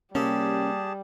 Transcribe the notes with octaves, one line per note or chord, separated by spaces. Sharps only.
C3 G3 A#3 C4 C#4 G4 G#4 A5